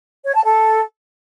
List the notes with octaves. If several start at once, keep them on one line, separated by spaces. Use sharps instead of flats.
C#5
A5
A4